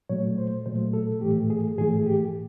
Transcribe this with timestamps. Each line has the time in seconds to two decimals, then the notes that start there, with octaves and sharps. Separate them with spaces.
0.09 A#2 F#3 A3 C#5
0.38 C5
0.66 A#2 F#3 A3 C5
0.93 A4
1.21 A2 E3 A3 G4
1.50 G#4
1.78 A2 E3 A3 G#4
2.06 G4